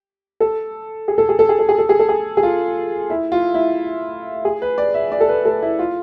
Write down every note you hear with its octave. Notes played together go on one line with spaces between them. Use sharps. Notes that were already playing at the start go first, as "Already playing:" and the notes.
A4
G#4
A4
G#4
A4
G#4
A4
G#4
A4
G#4
A4
G#4
G#4
F4
E4
F4
E4
G#4
B4
D5
E5
D5
A4
B4
A4
E4
F4